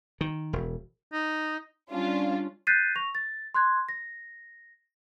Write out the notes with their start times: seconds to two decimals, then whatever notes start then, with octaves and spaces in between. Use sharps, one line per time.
0.21 D#3
0.53 E1
1.13 D#4
1.91 G3 C#4 D4 F4
2.67 F#6 G6 A6 B6 C7 D#7
2.96 C#6 A#6 F7
3.15 A6
3.54 C6 F#6 G#6
3.89 A#6